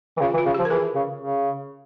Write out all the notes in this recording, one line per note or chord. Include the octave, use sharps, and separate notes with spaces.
E3
C#3 F4
E3
F4
C#3
G4
F3
A#4
E3 G#4
C#3
C#3